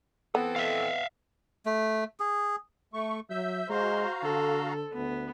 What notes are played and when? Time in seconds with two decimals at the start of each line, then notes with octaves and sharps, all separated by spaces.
0.35 E3 B3 C4 A4
0.56 E5 F5
1.66 A3
2.20 G#4
2.94 A3 C#6
3.30 F#3 E5 E6 G6
3.70 G#3 F#4 C5 F5 A#5
4.22 D3 A4
4.94 D2 B3